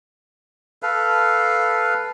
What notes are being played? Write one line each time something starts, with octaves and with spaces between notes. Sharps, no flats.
A4 B4 F5